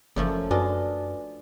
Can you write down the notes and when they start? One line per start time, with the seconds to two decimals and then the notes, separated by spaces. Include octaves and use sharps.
0.16 F#1 F#2 F3 A3
0.51 F#2 D4 F4 F#4 B4 D#5 G#5